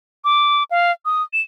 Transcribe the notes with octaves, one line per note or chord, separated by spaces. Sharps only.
D6
F5
D#6
E7